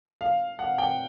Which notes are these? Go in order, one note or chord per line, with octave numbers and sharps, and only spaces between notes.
F5
F#5
G5